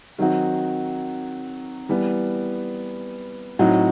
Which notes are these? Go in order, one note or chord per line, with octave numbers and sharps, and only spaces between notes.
D#3 F#3 C4 D#4 F#4
E3 G3 B3
A2 F#3 C4 D#4 F#4